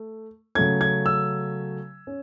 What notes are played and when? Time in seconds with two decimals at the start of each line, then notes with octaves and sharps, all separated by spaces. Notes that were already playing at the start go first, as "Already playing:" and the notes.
Already playing: A3
0.55 C#3 F#3 A3 C#4 G#6
0.81 G#6
1.06 E6
2.07 C#4